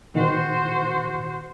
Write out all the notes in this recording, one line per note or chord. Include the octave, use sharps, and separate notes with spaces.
A#2 D#3 F#4 C5